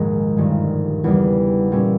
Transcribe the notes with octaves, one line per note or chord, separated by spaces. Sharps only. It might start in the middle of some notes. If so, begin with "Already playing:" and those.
Already playing: A#1 D#2 G#2 D#3 G#3 D#4
G1 G2 D#3 G3
E2 C#3 G3
A#2 G3 C#4 E4